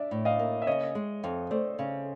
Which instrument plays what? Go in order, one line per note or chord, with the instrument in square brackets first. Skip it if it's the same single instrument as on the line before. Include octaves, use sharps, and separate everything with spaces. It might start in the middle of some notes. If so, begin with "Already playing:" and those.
Already playing: [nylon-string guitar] D4 [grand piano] D5 E5
[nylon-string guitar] A2
[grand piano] D#5 F5
[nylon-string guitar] A#3
[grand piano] E5
[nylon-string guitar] C#3 [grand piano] C#5 D#5
[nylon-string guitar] G#3
F2
[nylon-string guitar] A3 [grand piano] C5 D5
[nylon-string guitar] C#3